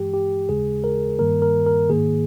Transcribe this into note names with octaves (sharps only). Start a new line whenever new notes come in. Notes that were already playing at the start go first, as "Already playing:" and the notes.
Already playing: G2 E3 G#3 G4
G4
D#2 C#3 G#3 G#4
A#4
G2 D#3 G3 A#3 A#4
A#4
A#4
G#2 D#3 A#3 G#4